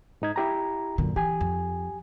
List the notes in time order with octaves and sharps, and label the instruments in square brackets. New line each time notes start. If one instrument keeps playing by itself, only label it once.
[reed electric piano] G#2 D#4 G#6
E4 G4 A#5
[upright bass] F#2 D3 [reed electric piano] A#2
[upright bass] E3 [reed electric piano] G4 G#5
[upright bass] F2